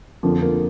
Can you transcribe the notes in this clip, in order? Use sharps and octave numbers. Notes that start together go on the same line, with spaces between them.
F2 D3 F3 A#3
A#3